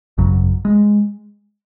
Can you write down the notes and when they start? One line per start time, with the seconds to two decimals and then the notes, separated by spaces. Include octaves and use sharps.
0.18 G#1 F#2 C#3 F#3
0.65 G#3